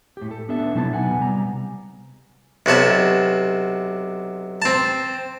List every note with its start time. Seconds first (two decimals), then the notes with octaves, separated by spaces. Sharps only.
0.17 A2 G4
0.31 A4
0.49 B3 D4 A4 E5 A5
0.75 C3 F#3 D#4 E4 A5
0.92 B2 B3 F#5 G#5
1.19 C3 G3 A#5
2.66 B1 C3 F#4 A5
4.62 C4 A5